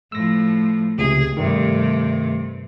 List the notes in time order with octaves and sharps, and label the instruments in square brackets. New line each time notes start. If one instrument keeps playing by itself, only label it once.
[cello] A2 F3 [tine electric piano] E6 A#6
[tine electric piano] C#2 C3 [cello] G#4
[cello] G2 C3 [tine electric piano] D#3 G3 A3